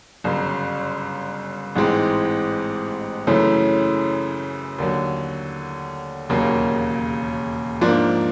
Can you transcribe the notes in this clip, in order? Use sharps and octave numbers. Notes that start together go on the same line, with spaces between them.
G1 F#2 C#3
A1 G#2 E3 G#3 C4
F#2 C#3 E3 A3 C#4
D#2 D3 F#3
E1 D#2 C#3 F#3 A#3
G#2 F3 A#3 D4